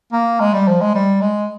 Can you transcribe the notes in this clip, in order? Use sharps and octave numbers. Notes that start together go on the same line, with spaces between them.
A#3
G#3
G3
F3
G#3
G3
G#3